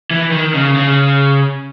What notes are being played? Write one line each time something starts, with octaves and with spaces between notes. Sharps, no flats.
E3
D#3
C#3
C#3